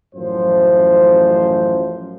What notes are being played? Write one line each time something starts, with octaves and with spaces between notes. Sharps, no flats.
A1 F#2 F3 C5